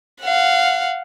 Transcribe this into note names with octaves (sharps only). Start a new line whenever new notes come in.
F5 F#5